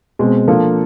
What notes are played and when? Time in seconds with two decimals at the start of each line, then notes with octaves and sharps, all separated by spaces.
0.19 B2 G#3 C4
0.48 F3 A#3 D4 F4 A4